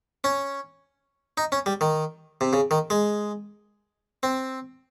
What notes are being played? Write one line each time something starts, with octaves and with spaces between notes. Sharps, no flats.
C#4
D#4
C#4
G3
D#3
C3
C#3
D#3
G#3
C4